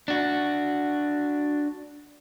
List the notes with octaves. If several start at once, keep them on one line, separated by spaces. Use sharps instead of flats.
D4 F#4